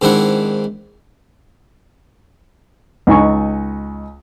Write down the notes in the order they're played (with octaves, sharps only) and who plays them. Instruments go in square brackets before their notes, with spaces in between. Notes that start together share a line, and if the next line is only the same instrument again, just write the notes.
[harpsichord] G#2 D#3 C4 D4 E4 F#5
[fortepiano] C#2 D#4 G#5 C#6